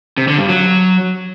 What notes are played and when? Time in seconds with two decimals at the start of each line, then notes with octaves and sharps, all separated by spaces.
0.17 C3
0.28 D3
0.38 G2
0.48 F#3